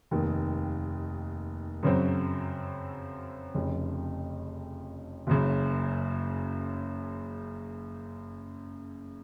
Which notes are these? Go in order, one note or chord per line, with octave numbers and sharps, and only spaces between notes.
F1 D#2 D#3
F#2 C#3 F#3 C4
F1 F2 C#3
F#1 F#2 C#3